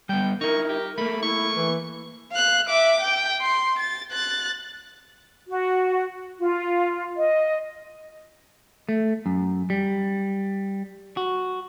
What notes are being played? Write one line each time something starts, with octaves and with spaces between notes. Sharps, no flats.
G3 B3 G5
D#4 E4 A#4 C#6
G4
A3 A#3 B5
E4 C#6
E3
F5 F#6
E5 D6
G5
C6
A6
F#6 A6
F#4
F4
D#5
A3
F#2
G3
F#4